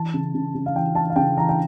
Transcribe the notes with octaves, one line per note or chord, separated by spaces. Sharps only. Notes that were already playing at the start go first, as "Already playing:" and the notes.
Already playing: E3 A5
C#3
C#3
C#3
F5
E3 G5
E3 A5
F5
C#3 G5
E3 A#5
G5